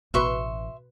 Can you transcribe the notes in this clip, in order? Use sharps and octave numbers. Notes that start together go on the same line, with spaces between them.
A1 B2 F#4 B4 E5 C6 C#6